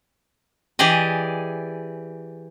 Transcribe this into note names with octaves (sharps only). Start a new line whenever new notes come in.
E3 G4 G#4 D5 D#5